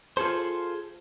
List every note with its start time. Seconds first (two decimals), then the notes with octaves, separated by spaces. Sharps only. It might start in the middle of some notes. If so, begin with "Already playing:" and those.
0.17 F4 G#4 A4 C5